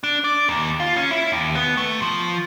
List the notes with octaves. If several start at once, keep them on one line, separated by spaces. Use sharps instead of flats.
D4
D5
D#2
F4
C#4
E4
D#2
B3
A3
F3